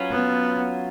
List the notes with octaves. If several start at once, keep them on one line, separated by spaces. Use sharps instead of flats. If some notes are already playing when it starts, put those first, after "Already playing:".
Already playing: F#3 C#4 F4 B4
B3